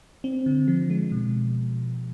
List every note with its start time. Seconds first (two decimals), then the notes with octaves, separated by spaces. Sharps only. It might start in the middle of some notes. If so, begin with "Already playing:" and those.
0.24 C4
0.46 D3
0.68 F3
0.90 G#3
1.12 B2